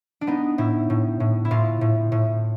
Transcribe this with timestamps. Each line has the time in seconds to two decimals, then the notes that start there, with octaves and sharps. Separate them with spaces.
0.21 D4
0.27 B3 D#4
0.58 A2 E4
0.90 A2
1.20 A2
1.45 E4
1.51 A2 F4
1.81 A2
2.12 A2